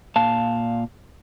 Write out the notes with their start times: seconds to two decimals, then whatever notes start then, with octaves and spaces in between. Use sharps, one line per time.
0.16 A#2 F5 A5